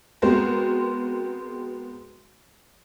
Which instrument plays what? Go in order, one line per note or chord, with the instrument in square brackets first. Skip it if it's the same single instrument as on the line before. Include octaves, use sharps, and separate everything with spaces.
[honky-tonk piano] G#3 B3 C4 F#4 A#4 C5